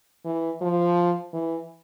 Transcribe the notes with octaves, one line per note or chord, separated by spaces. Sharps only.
E3
F3
E3